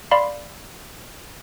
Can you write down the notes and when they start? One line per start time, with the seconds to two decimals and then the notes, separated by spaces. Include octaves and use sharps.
0.11 D5 F5 B5 C6 C7